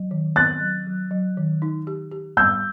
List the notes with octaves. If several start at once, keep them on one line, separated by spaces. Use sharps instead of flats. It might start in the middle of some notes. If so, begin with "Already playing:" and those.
Already playing: F#3
D#3
C4 F#6 A6
F#3
F#3
F#3
D#3
D#4
G4
G4
G3 E6 G6